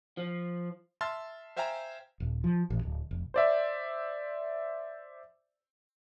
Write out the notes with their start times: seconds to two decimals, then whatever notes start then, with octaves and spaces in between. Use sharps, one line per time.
0.17 F3
1.01 E5 A5 C6 E6 F6 A6
1.57 C5 E5 F5 G5 G#5 A#5
2.20 D#1
2.44 F3
2.70 A1
2.83 D1
3.11 F1
3.34 C5 D5 E5